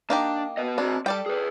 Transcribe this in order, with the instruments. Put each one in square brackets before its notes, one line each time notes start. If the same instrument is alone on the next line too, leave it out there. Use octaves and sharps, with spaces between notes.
[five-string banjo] A#3 D#4 G4 [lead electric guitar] D4
[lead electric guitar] B3 D#5
[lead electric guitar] C4 F#4 [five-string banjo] D4
[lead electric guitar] G3 [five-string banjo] A4 D5 G5
[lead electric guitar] G#4 B4